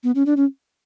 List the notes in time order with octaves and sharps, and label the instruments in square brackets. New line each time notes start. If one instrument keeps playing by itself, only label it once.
[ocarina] B3
C#4
D4
C#4